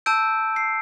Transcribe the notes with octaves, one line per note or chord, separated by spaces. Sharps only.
A5 E6 G6 D7
C7